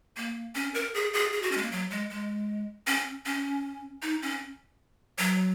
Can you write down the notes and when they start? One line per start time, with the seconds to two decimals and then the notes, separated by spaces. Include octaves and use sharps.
0.17 A#3
0.55 C#4
0.74 A#4
0.94 G#4
1.13 G#4
1.32 G#4
1.42 F#4
1.52 C#4
1.57 G#3
1.62 A#3
1.71 F#3
1.90 G#3
2.10 G#3
2.87 C#4
3.26 C#4
4.02 D#4
4.22 C#4
5.18 F#3